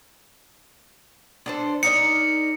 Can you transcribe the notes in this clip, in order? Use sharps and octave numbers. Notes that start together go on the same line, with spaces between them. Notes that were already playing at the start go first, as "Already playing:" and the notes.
D4 A4 C5
D#4 A#4 D5 C#7